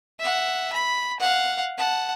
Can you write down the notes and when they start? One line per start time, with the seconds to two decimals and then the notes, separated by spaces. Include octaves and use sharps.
0.19 E5 F#5
0.72 B5
1.20 F5 F#5
1.78 F#5 A5